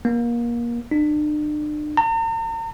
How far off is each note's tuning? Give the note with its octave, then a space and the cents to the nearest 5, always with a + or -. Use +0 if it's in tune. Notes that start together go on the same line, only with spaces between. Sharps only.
A#3 +25
D4 +40
A#5 -45